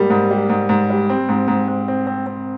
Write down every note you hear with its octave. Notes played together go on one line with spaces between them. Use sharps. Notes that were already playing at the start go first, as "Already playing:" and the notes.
Already playing: G#2 G3 A#3
G#2
G3
G#2
G#2
G3
C4
G#2
G#2
G#2
C4
C4
C4